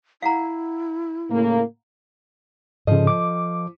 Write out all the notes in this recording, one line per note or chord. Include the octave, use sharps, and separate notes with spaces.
E4 F5 F#5 A#5
A2 C#3 A#3
G#2 C#3 F3 A4 D#5
D6